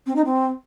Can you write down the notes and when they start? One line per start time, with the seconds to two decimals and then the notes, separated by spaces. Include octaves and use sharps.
0.07 C4
0.16 D#4
0.25 C4